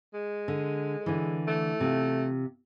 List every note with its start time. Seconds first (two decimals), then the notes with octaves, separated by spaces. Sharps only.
0.14 G#3
0.48 D3
1.06 D3 E3
1.47 A3
1.80 C3 F4